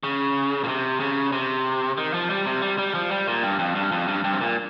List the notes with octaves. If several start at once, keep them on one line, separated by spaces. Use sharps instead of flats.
C#3
A#2
C3
C#3
C3
D#3
F3
G3
C3
G3
G3
F3
G3
A#2
G2
F2
G2
F2
G2
G2
C3
A#2